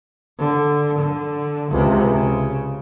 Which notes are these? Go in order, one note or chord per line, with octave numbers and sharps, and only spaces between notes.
D3
D3
C#2 C3
C#3